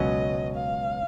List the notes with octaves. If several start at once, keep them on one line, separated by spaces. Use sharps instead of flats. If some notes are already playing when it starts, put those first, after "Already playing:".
Already playing: C#2 B2 F#3 C#4 D#5
F5